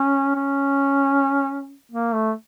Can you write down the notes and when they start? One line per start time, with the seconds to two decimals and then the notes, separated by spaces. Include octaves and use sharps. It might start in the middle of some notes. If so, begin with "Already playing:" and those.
Already playing: C#4
0.36 C#4
1.92 A#3
2.13 A3